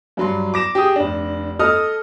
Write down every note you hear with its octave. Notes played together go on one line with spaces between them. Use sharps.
G2 F#3 C6
D6 A#6 E7
G4 G#4 D#6
F1 D4
A4 D#5 D#6 F6